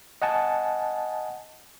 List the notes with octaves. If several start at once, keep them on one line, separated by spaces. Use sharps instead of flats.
D#5 F#5 G#5 A5